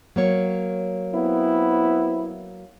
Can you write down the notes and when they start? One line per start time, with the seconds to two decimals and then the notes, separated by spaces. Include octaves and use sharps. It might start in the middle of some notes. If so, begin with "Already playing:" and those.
0.16 F#3 A#3 C#5
1.14 B3 C4 E4